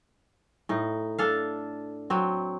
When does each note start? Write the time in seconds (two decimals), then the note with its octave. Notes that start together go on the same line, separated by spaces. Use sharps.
0.69 A2 D#4
1.19 D4 A4 F5
2.10 F#3 C4